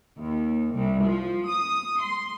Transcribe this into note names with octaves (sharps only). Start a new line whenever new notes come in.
D#2
C2
F3
D#6
C6